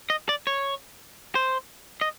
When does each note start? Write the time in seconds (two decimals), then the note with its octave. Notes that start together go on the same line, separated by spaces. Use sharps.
0.10 D#5
0.29 D5
0.47 C#5
1.35 C5
2.01 D#5